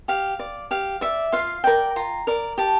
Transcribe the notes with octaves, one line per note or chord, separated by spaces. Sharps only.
G4 F5
D5
G4 F5
D5 E5
F4 F5
A#4 D5 G5
F4 A#5
A#4 D5
G4 A5